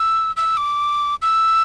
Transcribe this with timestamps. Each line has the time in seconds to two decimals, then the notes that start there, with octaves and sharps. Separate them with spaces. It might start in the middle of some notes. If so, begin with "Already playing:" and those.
Already playing: E6
0.37 E6
0.57 D6
1.22 E6